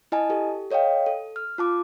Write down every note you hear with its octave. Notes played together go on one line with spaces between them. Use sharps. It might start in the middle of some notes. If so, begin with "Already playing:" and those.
E4 D#5 G#5 A5
G4 A4
A4 C#5 D#5 F5 G5
A4
F6
F4 A5 D6